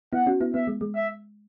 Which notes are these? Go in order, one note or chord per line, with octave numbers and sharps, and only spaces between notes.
B3 E4 F#5
C#4 F#4
B3 E4
B3 E5
G#3
G#3
E5